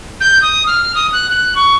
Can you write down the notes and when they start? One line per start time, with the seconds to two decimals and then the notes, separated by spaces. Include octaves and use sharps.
0.21 G6
0.42 D#6
0.67 F6
0.95 D#6
1.13 F#6
1.30 F#6
1.55 C#6